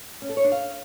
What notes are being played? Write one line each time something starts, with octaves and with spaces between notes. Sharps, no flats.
C#4
A4
C#5
D4
F5